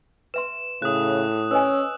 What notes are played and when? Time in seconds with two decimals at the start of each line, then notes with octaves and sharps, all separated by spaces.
0.34 B4 E5 C6 E7
0.82 A2 C#3 D#6 F#6
1.51 C#4 B4 D#5 G#5 E6